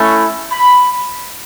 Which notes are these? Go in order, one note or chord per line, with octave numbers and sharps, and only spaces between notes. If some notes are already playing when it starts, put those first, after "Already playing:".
Already playing: A3 C#4 E4
B5